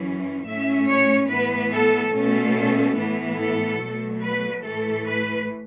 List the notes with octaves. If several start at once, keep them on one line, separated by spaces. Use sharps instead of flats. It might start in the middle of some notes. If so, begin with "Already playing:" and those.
Already playing: F#2 E3 C#4
A2 A3 C#4 E5
C#5
A2 E3 B3 B4
A4
B2 A3 C#4 A4
A2 E3 B3
A4
B2 F#3 A3
B4
A2 E3 A3 A4
B4